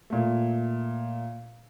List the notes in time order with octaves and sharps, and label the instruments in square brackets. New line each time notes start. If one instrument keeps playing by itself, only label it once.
[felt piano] A#2 A3